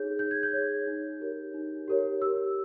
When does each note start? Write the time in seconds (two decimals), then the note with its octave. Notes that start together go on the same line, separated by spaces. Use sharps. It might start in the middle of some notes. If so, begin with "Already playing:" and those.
Already playing: D#4 G#4 C#5 G6
0.19 D#4 G6
0.31 G#6
0.43 G6
0.53 G#4 C#5
0.87 D#4
1.20 G4 A#4 C#5
1.54 D#4
1.88 G4 A#4 C#5
2.22 G4 E6